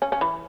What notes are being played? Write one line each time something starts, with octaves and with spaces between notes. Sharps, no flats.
C#4
C#4
E3